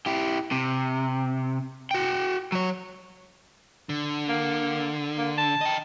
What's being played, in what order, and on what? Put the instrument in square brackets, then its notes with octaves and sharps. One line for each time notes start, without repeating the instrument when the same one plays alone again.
[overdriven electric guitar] E4 G4
C3
F#4 G5
F#3 C#5
[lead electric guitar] D3
[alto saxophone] A#3
A#3
A5
[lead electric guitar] D#5 G5